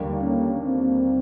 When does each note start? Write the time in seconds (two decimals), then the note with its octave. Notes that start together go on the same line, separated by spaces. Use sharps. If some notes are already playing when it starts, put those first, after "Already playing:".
Already playing: D#2 D3 G3 A#3
0.21 C#4
0.64 C4